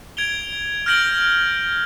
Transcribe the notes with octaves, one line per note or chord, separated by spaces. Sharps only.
G#6 D7 F7 G7
F6 G6 A#6 D7 F#7